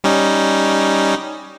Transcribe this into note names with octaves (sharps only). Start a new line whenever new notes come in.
G3 C#4 D#4